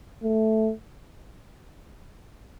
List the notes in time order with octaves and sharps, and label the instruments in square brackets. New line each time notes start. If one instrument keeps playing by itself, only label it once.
[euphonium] A3